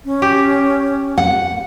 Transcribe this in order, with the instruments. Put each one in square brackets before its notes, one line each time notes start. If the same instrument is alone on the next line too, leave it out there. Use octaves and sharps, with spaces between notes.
[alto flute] C#4
[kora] G4
[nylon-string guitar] F#5